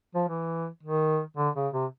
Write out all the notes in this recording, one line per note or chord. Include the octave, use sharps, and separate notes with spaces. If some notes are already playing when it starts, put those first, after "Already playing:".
F3
E3
D#3
D3
C#3
C3